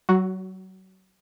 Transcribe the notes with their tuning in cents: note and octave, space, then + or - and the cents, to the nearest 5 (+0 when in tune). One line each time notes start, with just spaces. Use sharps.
F#3 +30 F#4 +0